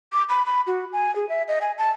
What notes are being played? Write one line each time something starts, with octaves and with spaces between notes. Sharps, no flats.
D6
B5
B5
F#4
G#5
G#4
E5
D#5
G#5
A5